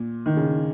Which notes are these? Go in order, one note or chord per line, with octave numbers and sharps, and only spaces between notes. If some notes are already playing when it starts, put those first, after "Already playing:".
Already playing: A#2
D#3
C#3